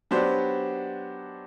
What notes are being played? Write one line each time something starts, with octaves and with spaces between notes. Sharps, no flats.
F#3 B3 D4 G4 C5